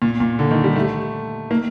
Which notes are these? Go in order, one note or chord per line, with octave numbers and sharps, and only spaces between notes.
A#2
A#2
D3
D#3
G3
A3
A#3